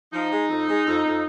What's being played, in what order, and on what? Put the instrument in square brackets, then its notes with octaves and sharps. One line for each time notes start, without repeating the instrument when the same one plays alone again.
[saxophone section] F3 D#4
G#3
F2
G#3
F2
F2